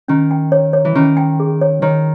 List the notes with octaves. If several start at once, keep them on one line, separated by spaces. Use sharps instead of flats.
D#3 C#4
G5
C#5
C#5
E3
D#3 C#4
G5
G#4
C#5
D#3 C#5